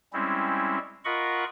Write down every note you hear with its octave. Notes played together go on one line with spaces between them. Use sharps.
G3 G#3 C4 C#4 E4
F4 A#4 D#5 F#5 B5 C#6